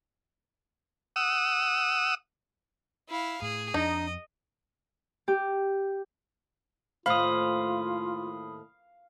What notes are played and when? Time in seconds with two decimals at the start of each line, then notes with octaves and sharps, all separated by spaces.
1.16 F#5 D#6 E6
3.09 E4 F5
3.42 A2 G#4
3.74 F2 D4 D#4 D#5
5.28 G4
7.06 D#2 A2 C4 F4 F5 B5 D#6